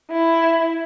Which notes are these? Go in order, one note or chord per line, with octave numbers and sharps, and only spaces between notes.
E4